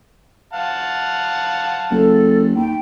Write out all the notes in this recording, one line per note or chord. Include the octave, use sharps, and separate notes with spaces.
F5 F#5 A5
F#1 A4
D#2 G5